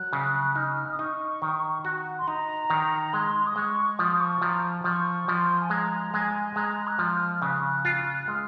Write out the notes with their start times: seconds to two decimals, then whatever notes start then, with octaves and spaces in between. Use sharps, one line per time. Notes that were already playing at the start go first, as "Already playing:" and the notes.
Already playing: F#3 F#6
0.13 C#3
0.56 D#4 F6
0.84 F6
0.92 D#6
0.99 D#4 C#6
1.42 D#3
1.85 F#4
2.19 C6
2.27 D#4 A#5
2.70 D#3
3.13 G#3 C6
3.47 D#6
3.56 G#3 C#6
3.99 F3 D#6
4.12 D#6
4.20 C#6
4.42 F3 A#5
4.84 F3 C#6
5.28 F3 C6
5.60 G#5
5.70 G#3 A#5
6.14 G#3 G#5
6.49 G#5
6.56 G#3 A#5
6.87 F#6
6.99 F3 F6
7.42 C#3 F#6
7.85 F4
8.28 G#3 F6